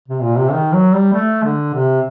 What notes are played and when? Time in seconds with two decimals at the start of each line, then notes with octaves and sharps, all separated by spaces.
0.08 C3
0.23 A#2
0.37 C3
0.52 D#3
0.73 F#3
0.94 G3
1.13 A3
1.44 D3
1.74 C3